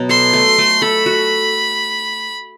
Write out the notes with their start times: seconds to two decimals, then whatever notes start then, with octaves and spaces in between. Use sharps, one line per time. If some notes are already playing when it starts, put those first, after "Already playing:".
Already playing: B2 F#3
0.09 A4 C6
0.33 A3
0.58 A3
0.82 A4 B5
1.06 F#4